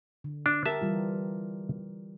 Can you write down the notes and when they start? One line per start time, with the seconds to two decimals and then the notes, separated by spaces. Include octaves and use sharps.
0.24 D3
0.46 D4
0.66 G4 A#4 E5 A5
0.81 E3 G3 F4